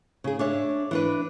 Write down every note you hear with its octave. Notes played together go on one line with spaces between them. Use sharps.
C#3 G#4
D4 C#5 E5
E3 D4 B4